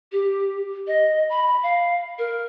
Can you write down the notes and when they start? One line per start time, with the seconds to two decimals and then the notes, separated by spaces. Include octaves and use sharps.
0.12 G4
0.87 D#5
1.30 B5
1.63 F5
2.19 A#4